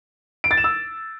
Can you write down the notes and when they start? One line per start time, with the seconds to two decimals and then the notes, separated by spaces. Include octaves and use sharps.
0.44 D7
0.51 A6
0.57 E7
0.64 E6